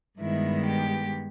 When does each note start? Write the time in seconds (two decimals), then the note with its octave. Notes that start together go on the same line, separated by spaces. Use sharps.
0.19 G2 D#3 G#3 B3 E4
0.65 G4